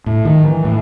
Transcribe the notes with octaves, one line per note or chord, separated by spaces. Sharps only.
A2
D#3
E3
A2